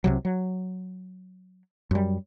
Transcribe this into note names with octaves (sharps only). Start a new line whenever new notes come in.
C2 C3 F#3
F#3
F#2 G3